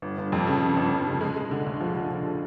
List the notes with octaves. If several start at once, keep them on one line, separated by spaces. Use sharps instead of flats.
G1
G1
F2
C#3
C#3
G1
G1
C#3
G#3
G#3
D3
D2
F3
D3
D3
D3